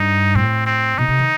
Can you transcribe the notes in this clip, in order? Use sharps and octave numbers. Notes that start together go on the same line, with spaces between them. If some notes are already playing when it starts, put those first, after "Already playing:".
Already playing: G2 D#4
A2 C4
C4
B2 D#4
C3
D#3